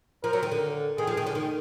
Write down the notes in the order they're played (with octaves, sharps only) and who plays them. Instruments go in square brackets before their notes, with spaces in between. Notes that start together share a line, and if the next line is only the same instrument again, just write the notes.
[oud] F3 [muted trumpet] A#4
[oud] F#3
D#3
D3
[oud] D#3 [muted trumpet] G#4
[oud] F3
D#3
D3
D#3